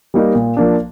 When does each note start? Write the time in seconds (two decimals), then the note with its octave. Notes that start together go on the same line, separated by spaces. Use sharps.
0.14 G3 A#3 D#4
0.35 A#2
0.57 F3 A#3 D4